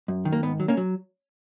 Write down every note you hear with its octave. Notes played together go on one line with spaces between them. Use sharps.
F#2
D#3
A#3
G#2 B3
F#3
A#3 C#4
F#3